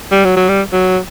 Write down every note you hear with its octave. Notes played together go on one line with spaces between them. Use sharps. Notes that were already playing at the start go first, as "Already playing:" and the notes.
G3
F#3
F#3
G3
F#3